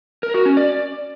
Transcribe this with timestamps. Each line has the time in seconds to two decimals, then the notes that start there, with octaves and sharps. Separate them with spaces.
0.23 A#4
0.34 F#4
0.46 C#4
0.57 D5